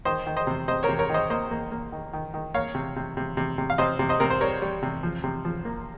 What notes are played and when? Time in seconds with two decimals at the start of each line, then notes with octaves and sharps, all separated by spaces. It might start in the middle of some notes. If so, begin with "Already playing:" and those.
0.05 D#3 C5 D#5
0.26 D#3
0.37 C5 D#5
0.47 C3
0.68 C3 C5 D#5
0.83 A#4 C#5
0.89 C3
0.99 A#4 C#5
1.09 D#3 C5 D#5
1.30 A#3 C5 D#5
1.51 A#3
1.72 A#3
1.92 D#3
2.13 D#3
2.34 D#3
2.54 A#3 C#5 F5
2.75 C3
2.96 C3
3.17 C3
3.37 C3
3.58 C3
3.70 F5
3.78 C3 C5 D#5
3.99 C3
4.09 C5 D#5
4.20 C3 A#4
4.30 C5
4.41 G3 A#4 C#5
4.62 G3
4.83 C3
5.03 F3
5.24 C3
5.45 F3
5.65 A#3